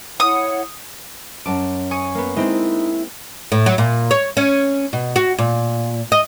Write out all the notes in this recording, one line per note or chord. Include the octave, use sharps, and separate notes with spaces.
E4 C#5 F#5 D#6
F#2 A5 D6
G#5 C#6 D#6
A#3 B3
G#3 C4 D#4 E4
A2
F#3
A#2
C#5
C#4
B2
F#4
A#2
D#5